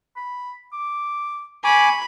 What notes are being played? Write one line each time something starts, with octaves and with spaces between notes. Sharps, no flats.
B5
D6
G#5 B5 C#6 D6